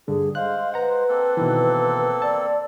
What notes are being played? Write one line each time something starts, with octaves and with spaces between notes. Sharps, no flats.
G2 D3 G#4
G#3 C5 F5 F#6
B4 F#5 A#5
A#3 C4 A4
B2 D#3 E3
D5 A5